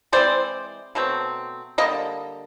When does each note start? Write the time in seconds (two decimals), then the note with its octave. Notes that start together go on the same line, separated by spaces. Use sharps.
0.13 E3 G#3 C4 C5 D5
0.95 B2 F#3 A3 C4
1.78 D3 G3 A#3 D#5